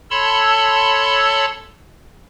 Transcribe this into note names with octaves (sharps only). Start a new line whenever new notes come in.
A4 C#5 A5 B5 C6 E6